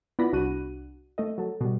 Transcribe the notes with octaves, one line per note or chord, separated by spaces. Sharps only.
B3 E4 F4 D5 B5 A#6
C2 D4 F#4 F#6 D#7
A3 A4 D#5
F#3 A4
B2 G3